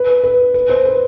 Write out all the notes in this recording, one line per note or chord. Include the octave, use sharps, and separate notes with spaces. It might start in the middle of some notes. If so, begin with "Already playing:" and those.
Already playing: B4
B4
B4
C5
B4